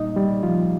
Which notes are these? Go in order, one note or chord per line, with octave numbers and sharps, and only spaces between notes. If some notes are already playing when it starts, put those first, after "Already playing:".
Already playing: A#2 G3 A#3 D#4 D#5
G3 G4
F3 F4